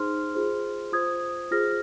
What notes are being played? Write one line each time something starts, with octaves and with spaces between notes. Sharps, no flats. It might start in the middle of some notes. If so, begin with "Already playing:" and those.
Already playing: D#4 G#4 C5 C6 F6
F4 G#4 C5
F4 C5 D#6 G#6
F4 G#4 C5 F6 A#6